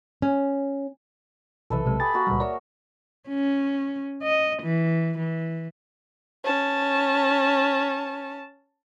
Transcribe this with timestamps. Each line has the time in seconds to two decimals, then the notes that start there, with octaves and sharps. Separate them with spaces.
0.22 C#4
1.70 B1 C3 E3 A4 B4 E5
1.85 B1 C3 G#3
2.00 G4 G#4 B5 A6
2.13 A#3 F#4 A#4
2.27 C#2 A#2 G3
2.40 A#4 C#5 D5 E5
3.29 C#4
4.23 D#5
4.62 E3
5.18 E3
6.44 C#4 A5